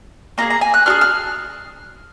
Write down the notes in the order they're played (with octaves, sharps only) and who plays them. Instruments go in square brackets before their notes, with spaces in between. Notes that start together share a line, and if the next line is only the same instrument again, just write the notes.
[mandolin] A#3 F4 G#4 A#5
A#5
G#5
F#6
D4 F4 G#4 F6
F6